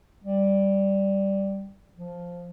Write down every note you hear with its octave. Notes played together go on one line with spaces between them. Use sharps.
G3
F3